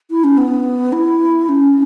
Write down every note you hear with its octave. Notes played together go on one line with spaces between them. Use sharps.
E4
C#4
B3
E4
C#4